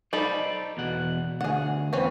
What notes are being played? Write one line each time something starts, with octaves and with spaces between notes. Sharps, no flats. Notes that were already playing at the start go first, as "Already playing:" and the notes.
D#4 A4 C5 D5 B5
E2 B2 F#5
D2 G#4 F#5
E2 C4 C#4 B4